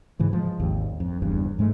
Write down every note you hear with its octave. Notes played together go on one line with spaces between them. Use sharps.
G#2 C#3 E3
F3 G#3
G#1 D#2
F2
F#1 E2 G2
G#2 G#3 A3